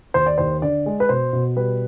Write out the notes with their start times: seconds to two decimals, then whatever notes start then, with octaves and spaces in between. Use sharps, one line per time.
0.14 D#2 C5
0.26 D5
0.38 D#2 C5
0.62 D3 D5
0.86 G#3
1.00 B4
1.09 B2 C5
1.33 B2
1.56 G3 B4